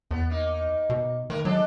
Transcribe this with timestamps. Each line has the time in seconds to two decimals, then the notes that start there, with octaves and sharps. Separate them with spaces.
0.11 E2 B3
0.30 A#3 D#4
0.90 B2
1.30 D#3 A3 A#4 B4
1.45 F#3 G#3 D4 A4